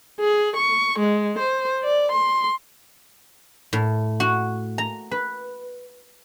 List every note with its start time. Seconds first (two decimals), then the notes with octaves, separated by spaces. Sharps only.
0.20 G#4
0.56 C#6
0.99 G#3
1.39 C5
1.83 D5
2.12 C6
3.73 A2
4.20 F#4
4.78 A#5
5.11 B4